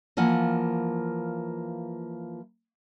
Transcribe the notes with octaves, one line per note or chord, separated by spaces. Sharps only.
E3 F3 A#3 F#5 G#5